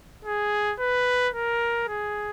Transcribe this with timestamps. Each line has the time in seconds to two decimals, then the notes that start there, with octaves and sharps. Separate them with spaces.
0.25 G#4
0.79 B4
1.34 A#4
1.88 G#4